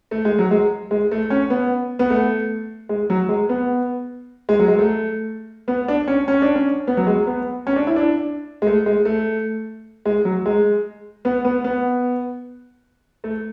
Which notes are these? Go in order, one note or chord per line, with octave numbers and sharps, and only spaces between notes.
A3
G#3
F#3
G#3
G#3
A3
C#4
B3
B3
A3
G#3
F#3
G#3
B3
G#3
F#3
G#3
A3
B3
D4
C#4
C#4
D4
C#4
B3
F#3
G#3
B3
C#4
D4
E4
D4
G#3
A3
G#3
A3
G#3
F#3
G#3
B3
B3
B3
A3